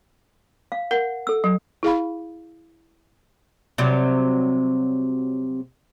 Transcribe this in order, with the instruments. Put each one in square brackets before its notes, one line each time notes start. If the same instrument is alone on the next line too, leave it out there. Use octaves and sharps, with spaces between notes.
[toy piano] F5
[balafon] A#4 [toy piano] F#5
[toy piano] A4 E6
[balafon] F#3
E4 G#4 F5 B5
[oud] C3 F#3 G3